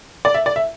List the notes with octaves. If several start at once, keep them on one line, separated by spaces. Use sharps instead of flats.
D5
E5
D5
E5